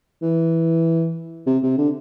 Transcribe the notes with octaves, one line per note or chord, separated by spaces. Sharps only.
E3
C3
C3
D3